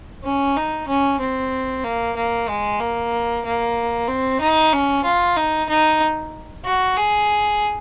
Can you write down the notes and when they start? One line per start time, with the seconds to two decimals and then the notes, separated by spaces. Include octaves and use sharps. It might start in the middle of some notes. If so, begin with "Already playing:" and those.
0.24 C#4
0.56 D#4
0.88 C#4
1.20 C4
1.84 A#3
2.16 A#3
2.48 G#3
2.80 A#3
3.45 A#3
4.08 C4
4.41 D#4
4.73 C#4
5.04 F4
5.37 D#4
5.69 D#4
6.65 F#4
6.97 G#4